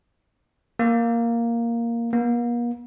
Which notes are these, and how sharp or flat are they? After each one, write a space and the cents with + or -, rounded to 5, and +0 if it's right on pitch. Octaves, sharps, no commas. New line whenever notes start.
A#3 +0
A#3 +40